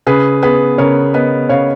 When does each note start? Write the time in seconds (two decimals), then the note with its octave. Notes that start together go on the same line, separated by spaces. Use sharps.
0.07 C#3 G#4 B4
0.43 B3 G#4 B4
0.78 C#3 A#4 C#5
1.14 B3 B4 D#5
1.49 C#3 C#5 F5